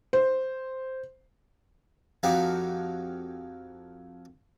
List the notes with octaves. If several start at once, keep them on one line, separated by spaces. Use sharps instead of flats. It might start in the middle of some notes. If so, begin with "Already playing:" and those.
C5
F2 F3 D#4 F#4 G4